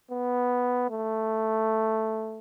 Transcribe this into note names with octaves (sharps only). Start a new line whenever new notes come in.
B3
A3